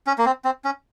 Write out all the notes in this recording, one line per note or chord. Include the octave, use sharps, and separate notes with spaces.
C#4
A#3
C4
C4
C#4